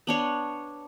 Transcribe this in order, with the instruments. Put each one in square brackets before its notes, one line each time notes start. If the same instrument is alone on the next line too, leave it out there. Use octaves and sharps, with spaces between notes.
[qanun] B3 D4 C#5